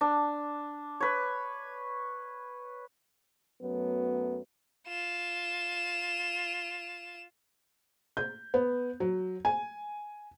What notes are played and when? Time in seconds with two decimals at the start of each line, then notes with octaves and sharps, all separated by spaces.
0.01 D4
1.01 B4 C#5
3.61 F#2 F#3 A3 B3
4.88 F4 E7
8.17 G6
8.54 B3
9.00 F#3
9.45 G#5